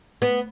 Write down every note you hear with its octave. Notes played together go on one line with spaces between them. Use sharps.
B3